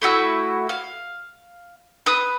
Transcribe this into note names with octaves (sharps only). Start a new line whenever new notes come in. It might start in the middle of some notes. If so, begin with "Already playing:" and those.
A3 E4 F#4 E6
F5
B4 D#6